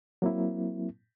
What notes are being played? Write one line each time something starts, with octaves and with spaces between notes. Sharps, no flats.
F#3 A#3 C4 E4